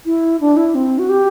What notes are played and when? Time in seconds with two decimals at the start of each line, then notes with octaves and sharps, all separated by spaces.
0.06 E4
0.41 D4
0.57 E4
0.75 C4
0.99 F#4
1.09 G4